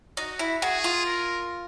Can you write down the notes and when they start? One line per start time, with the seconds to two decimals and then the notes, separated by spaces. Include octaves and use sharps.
0.17 D#4 F#4
0.39 E4
0.62 F#4 G#4
0.84 F4
1.06 A#4